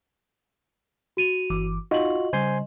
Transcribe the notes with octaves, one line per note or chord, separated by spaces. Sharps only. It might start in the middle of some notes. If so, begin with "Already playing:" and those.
F#4 D#7 F7
G1 E3 D6
D#4 F4 F#4 D#5 F#7
C#3 G3 C5 G#5 C6